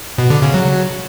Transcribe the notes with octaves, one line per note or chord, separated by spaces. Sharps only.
B2
D3
C#3
F#3